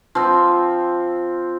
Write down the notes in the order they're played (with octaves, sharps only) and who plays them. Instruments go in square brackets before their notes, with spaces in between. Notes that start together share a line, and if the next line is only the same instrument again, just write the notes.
[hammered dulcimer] F3 C4